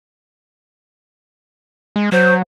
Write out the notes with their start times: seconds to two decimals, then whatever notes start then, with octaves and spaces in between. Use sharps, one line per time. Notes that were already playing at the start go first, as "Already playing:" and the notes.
1.96 G#3
2.12 F#3 C5